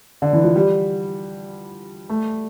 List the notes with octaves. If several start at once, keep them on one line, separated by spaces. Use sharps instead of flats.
D3
E3
F3
G3
A3